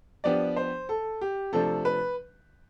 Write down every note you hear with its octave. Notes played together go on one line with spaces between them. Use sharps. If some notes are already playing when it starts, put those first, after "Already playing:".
F3 B3 D4 G4 D5
C5
A4
G4
C3 F3 A3 D4 A4
B4